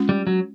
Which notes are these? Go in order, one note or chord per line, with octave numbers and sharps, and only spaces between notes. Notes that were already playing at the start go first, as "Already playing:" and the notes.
Already playing: G#3 C#4 F4
G3
F#3